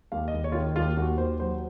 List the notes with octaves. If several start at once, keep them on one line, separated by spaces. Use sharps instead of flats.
D#2 F5
D#5
D#2
C#5
F4
D#3
D#4
D#2 F4
D#2 F#4
D#2 C5
F#3 C5